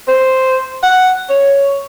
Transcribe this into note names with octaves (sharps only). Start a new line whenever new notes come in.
C5
F#5
C#5